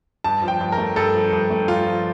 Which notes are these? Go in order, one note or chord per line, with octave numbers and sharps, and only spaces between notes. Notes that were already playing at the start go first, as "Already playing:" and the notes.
G2 A5
F3
G5
G2
A#4
A3
G2 A4
F3
G2
A3
G2 F4
F3